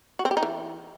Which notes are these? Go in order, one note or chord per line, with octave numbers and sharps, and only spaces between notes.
F#4
C4
G4
D#4
E3